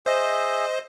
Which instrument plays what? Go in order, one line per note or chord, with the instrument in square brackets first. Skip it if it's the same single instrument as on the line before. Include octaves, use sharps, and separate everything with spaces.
[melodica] G#4 E5 [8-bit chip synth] C5 D#5